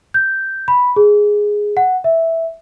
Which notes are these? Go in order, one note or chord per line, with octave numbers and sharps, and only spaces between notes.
G6
B5
G#4
F#5
E5